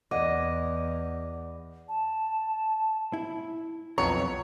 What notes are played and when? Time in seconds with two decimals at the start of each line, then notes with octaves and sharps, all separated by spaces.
0.11 E2 D5 D#5 F#5 D6
1.89 A5
3.13 E4
3.98 B1 F2 B3 C#5 A#5